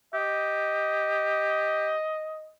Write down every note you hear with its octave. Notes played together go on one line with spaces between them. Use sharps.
G4 D#5